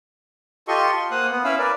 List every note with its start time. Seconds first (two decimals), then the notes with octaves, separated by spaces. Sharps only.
0.68 F4 G4 A4 D#5 C6 C#6
0.95 C6
1.11 A#3 C5 F5 F#5 D#6 F#6
1.31 B3
1.44 C#4 E4 E5 F5 B5
1.58 A#4 B4 D5